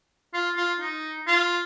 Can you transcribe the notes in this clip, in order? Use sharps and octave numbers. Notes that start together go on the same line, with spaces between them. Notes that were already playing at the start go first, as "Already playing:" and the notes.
F4
F4
D#4
F4